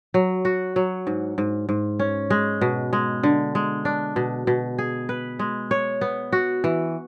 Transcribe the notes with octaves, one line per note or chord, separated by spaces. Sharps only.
F#3
F#4
F#3
G#2
G#2
G#2
C#4
G#3
B2
G#3
D3
G#3
D4
B2
B2
G#4
B4
G#3
C#5
B3
F#4
E3